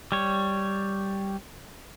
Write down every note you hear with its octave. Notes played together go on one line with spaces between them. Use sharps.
G3 C#5